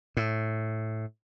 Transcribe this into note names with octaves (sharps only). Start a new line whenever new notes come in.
A2